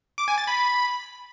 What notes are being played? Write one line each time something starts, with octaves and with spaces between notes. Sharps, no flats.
D6
G#5
A6
B5